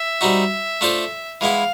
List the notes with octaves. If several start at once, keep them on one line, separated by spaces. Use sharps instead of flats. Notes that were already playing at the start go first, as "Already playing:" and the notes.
Already playing: E5
G3 C4 D#4 F#4
A3 D4 F4 A4 C5
E3 G#3 B3 E4 F5